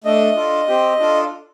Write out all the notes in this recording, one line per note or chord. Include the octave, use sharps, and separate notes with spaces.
A3 D4 A4 D#5
D4 F4 A4
C4 G4
D4 F4 A4